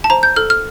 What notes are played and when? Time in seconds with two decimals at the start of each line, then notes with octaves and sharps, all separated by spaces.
0.04 A5
0.10 C5 A#5
0.23 G6
0.36 A4 F6
0.50 F6